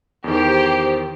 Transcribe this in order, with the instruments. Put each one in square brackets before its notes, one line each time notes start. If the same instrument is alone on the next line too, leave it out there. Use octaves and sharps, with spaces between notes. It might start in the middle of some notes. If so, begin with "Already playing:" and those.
[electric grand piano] E2 D#3 [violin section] G4 C5